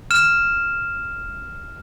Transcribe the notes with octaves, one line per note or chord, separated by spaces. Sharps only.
F6 E7